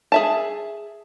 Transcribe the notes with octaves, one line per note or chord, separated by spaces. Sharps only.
G#4 E5 A5